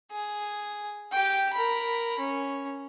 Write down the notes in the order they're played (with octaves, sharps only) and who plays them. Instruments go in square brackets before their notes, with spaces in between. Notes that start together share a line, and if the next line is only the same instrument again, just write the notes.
[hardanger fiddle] G#4
G4 G5
A#4 B5
C#4